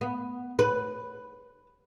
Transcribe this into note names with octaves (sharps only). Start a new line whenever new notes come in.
B3
B4